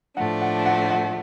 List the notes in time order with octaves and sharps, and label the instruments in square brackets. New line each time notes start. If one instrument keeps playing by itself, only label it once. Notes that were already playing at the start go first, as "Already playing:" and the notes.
[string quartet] A2 F3 A3 D4 [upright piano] F#5
[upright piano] F#5
F#5
F#5